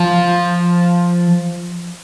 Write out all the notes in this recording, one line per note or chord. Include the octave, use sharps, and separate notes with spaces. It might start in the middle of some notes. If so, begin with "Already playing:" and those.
Already playing: F3